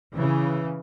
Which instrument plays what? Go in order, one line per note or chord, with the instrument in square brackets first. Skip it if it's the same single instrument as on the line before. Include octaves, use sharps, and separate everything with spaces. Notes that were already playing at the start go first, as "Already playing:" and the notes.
[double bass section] C#3 E3